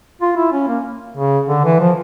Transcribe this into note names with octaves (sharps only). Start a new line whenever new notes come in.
F4
E4
C#4
A#3
C#3
D3
E3
F3